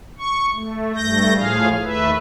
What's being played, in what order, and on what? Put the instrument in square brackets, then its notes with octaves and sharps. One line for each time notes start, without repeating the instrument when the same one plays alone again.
[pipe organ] C#6
A3
G2 A3 G6 A#6
A2 F3 G#4 F5
D#2 A3 B4 E5